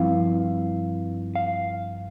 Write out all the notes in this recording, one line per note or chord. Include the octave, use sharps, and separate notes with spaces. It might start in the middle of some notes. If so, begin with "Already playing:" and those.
Already playing: G2 F3 C4 E4 F5
F5